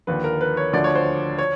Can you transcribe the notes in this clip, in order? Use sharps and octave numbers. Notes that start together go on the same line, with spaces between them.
D#2 D3 F3 B4
A#4
B4
C#5
D2 D3 F3 D5
C#5
C5
C#5